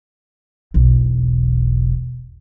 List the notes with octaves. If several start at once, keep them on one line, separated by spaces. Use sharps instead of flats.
E1 B1